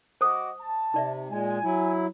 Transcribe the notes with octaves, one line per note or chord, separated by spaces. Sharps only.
F#4 C5 D#5 D6 D#6
A5
C3 D#4 D5 E5
A#2 G#3 G#5
F#3 E4